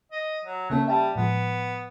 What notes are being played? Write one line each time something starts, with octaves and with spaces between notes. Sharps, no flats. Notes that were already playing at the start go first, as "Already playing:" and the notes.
D#5
F#3
C#3 A3 A#3 C#4
G3 E5 G5 A5
A2 F3 G#3 B3